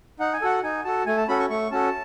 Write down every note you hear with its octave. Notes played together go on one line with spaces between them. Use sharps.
D#4 F#5
G#5
F#4 A4 F#5
D#4 G#5
F#4 A4 A5
A3 G#5
A5
C#4 F#4 A4 B5
C#6
A3 C#6
C#4 F#4 A4 A5